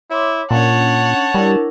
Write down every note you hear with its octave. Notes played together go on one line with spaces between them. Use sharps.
E4 C#5 C6 D6
A#2 C#4 D4 C#5 F#5 A5
G3 D4 E4 A#4